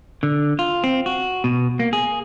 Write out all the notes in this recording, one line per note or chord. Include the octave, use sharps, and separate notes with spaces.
D3
F4
C4
F#4
B2
A#3
G#4